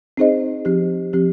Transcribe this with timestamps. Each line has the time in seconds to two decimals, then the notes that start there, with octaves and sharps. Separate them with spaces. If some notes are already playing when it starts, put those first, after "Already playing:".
0.17 C4 D#4 G#4 C5 D#5
0.65 F3 C4 G4
1.13 F3 C4 G4